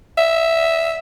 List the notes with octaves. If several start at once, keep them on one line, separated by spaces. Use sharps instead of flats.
E5